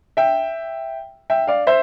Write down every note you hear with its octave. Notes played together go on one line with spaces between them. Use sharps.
E5 G5
E5 G5
D5 F5
C5 E5